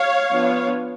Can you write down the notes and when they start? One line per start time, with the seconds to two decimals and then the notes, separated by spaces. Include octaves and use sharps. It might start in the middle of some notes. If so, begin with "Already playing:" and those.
Already playing: C#5 F5
0.29 F3 B3 D4 F4